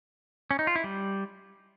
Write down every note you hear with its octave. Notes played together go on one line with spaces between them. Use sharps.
C#4
D#4
F4
E4
G3